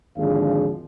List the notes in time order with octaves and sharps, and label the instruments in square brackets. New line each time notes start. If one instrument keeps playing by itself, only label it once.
[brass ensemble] G#1 D#2 D3 F3 G#4 F5